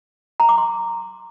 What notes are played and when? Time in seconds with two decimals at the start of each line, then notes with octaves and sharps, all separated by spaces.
0.40 A#5
0.49 D6
0.58 C6